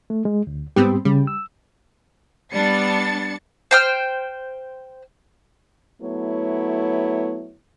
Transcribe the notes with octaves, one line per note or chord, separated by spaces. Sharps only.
A3
G#3
D2
G#2 G3 B3 C4 G4
C#3 G3
E6
G3 B3 D4 A6 C#7
C5 G5 F6
F#3 A3 B3 E4 C#5